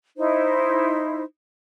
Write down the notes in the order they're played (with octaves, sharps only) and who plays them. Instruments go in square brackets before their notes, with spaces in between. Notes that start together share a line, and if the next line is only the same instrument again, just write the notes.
[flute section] D#4 E4 C5